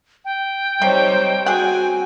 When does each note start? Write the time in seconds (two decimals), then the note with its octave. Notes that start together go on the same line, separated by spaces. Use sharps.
0.25 G5
0.82 C3 G3 D#4 C5 C#5
1.46 C4 F#4 G#4 F#5 G#5